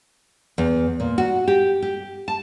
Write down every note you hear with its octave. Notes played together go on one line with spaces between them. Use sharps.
E2
A#2
F#4
G4
G4
A5